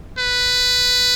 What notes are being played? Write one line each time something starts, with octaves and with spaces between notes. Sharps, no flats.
B4